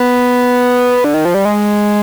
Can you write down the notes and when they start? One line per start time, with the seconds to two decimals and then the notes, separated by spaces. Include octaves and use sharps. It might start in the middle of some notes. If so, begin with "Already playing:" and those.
Already playing: B3
1.04 D3
1.14 D#3
1.25 F3
1.34 G3
1.45 G#3